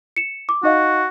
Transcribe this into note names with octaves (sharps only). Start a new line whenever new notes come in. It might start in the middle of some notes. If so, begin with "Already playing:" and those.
C#7 E7
D6
D#4 F#4 D#5 F5